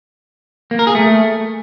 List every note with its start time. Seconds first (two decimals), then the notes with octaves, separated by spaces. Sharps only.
0.71 A#3
0.79 A#4
0.87 G#4
0.95 A3